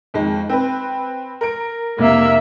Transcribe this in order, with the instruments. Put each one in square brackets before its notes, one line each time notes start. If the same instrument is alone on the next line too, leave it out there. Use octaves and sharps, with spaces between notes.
[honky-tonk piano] F2 D#3 G#3
C4 B4
A#4 D7
[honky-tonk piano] F1 [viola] A#3 E5